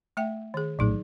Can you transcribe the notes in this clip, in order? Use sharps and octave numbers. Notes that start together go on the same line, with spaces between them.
A3 E5 G5
D#3 G#4
A#1 A2 F#3 D#4 G#4